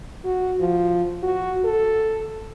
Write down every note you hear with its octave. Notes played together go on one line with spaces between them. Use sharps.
F#4
F3
F#4
A4